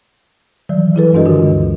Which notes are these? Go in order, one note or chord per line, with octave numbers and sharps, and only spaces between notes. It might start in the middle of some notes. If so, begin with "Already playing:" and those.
D#3 E3 F#3 G3 D5
E3 F#3 E4 G#4 A4 B4
G2 G#3 D4 F#4 A#4 D#5
D3 D#3 F4 G4
D2